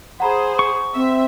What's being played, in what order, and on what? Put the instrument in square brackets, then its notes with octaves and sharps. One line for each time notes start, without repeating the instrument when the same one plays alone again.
[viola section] G#4 C5 [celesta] F#5 A#5 B5
[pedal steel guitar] C#6
[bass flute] C4 [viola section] E5